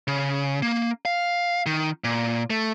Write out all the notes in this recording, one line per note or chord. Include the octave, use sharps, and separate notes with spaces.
C#3
A#3
F5
D#3
A#2
A3